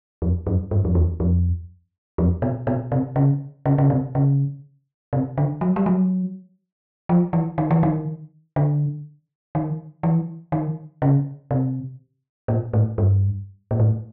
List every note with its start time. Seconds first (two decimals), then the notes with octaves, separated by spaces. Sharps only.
0.22 F2
0.47 F#2
0.71 G2
0.85 F2
0.95 E2
1.20 F2
2.18 F2
2.42 B2
2.67 B2
2.92 C3
3.16 C#3
3.66 C#3
3.78 C#3
3.90 C3
4.15 C#3
5.13 C3
5.38 D3
5.61 F#3
5.76 G3
5.86 F#3
7.09 F3
7.33 E3
7.58 D#3
7.71 E3
7.83 D#3
8.56 D3
9.55 D#3
10.03 E3
10.52 D#3
11.02 C#3
11.51 C3
12.48 A#2
12.73 A2
12.98 G2
13.71 A#2
13.80 A2